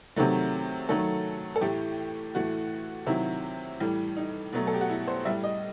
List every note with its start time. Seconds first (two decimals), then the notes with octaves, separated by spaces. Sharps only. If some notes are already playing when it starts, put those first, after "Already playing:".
0.16 C3 D#3 F#3 A3
0.89 D#3 F#3 A3 A4
1.56 A4
1.61 A2 E3 A3 G4
2.35 A2 E3 A3 F#4
3.07 C3 D#3 F#3 E4
3.80 A2 E3 G3
4.17 D#4
4.53 B2 F#3 A3
4.67 A4
4.74 G4
4.81 F#4
4.90 E4
5.07 C5
5.25 A2 G3 E5
5.44 D#5